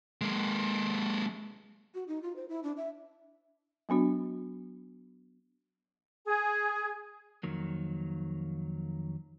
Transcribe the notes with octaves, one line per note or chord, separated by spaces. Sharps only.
G#3 A#3
F#4
D#4
F4
C5
E4
D4
E5
F#3 B3 D4 F#4
G#4
F2 D#3 F#3 A#3